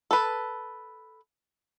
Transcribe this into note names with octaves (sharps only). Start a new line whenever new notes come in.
A4 B4